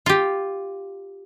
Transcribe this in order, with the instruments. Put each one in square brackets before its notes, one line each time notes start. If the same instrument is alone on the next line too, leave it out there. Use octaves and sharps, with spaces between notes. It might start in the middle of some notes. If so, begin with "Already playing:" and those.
[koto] F4 G4